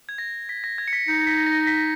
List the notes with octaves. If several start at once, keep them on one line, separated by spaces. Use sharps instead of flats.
G#6
A#6
B6
A#6
G#6
C#7
B6
D#4 C#7
C#7
B6
A#6
B6